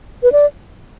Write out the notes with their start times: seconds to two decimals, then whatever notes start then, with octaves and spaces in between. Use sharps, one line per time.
0.23 B4
0.32 D5